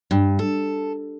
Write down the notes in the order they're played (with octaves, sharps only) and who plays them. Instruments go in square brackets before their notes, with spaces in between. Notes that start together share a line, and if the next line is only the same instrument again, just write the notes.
[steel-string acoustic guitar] G2
A4